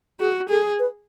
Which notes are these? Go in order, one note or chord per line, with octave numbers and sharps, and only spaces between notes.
F#4 G#4
G#4 A4
B4